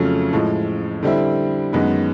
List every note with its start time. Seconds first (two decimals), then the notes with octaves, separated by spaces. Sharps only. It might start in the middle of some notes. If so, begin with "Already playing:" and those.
Already playing: F2 C#3 F#3 A3 C#4
0.33 A2 F3 G#3
1.03 D3 G3 C4 E4
1.73 F#2 D#3 G#3 B3